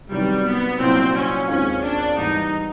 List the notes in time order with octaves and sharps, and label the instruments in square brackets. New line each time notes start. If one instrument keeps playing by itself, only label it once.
[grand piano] C3 D#3 F#3 B3 [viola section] G3
[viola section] B3
[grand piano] C2 A#2 F#3 [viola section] C4
[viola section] C#4
[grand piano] D#2 D#3 G#3 C4 F4 [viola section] C#4
[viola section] D4
[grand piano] G#2 E3 G3 B3 [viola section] D#4